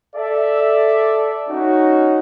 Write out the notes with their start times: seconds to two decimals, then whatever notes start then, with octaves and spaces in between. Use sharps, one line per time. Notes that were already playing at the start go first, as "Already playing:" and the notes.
0.15 A4 D5 E5
1.49 C#4 D#4 F#4